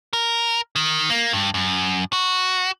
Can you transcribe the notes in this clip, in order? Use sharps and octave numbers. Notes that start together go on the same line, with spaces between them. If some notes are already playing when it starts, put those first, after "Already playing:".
A#4
D#3
A#3
G2
F#2
F#4